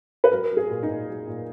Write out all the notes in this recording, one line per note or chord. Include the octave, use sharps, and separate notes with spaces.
B4
F#3 A#4
F#3
G#4
A#2
D#4
A#2
F#3
A#2